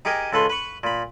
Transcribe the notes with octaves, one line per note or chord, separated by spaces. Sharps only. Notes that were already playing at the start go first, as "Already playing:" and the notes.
D#4 G4 G#4 A#4 D#5 G#5
C#2 A4 B4 C6
B4 B5 C#6
A#2 B5